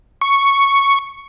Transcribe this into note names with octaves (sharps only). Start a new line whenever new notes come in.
C#6